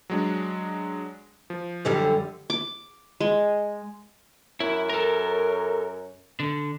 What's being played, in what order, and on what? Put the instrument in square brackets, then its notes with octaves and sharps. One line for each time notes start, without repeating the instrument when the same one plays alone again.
[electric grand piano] F#3 G#3 D4
F3
[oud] F#2 D3 G3
[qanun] D6
G#3
[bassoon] F#2 [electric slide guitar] E4
[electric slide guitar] A4 A#4
D3